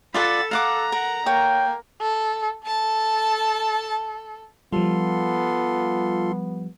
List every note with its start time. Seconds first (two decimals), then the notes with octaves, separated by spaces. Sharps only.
0.14 F4 A4 D5 F#5 B5 A6
0.51 F5 F#5 A#5 D6
0.92 A#4 F#5
1.26 A#3 C#5 G5
2.01 A4
2.67 A4 A5
4.73 F3 G3 B3 F4 A4 C6